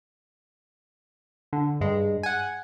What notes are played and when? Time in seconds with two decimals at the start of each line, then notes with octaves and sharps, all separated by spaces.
1.53 D3
1.81 G2 G#3
2.23 F#5 G#5